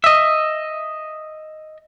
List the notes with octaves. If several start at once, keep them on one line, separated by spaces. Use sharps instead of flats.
D#5 E5